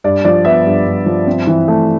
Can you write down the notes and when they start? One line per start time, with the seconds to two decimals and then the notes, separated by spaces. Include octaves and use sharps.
0.04 G2 D5
0.25 F3 D5
0.45 B3 E5
0.66 G2
0.86 G2
1.06 F3
1.27 C4
1.47 E3
1.68 A3